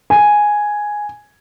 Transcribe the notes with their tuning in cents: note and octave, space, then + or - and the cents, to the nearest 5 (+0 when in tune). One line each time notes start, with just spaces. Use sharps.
G#5 +0